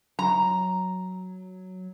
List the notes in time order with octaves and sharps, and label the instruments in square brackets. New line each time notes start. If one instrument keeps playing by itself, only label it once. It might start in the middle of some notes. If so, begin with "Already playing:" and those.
[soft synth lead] F#3 [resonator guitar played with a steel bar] A#5